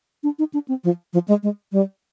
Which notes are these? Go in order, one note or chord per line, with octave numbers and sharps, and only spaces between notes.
D4
D#4
D4
C4
F3
F3
G#3
G#3
G3